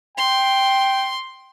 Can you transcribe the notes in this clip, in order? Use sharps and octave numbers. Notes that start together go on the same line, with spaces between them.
G5 C6